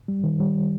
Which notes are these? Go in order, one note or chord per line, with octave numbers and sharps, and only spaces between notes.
G3
D#3
G3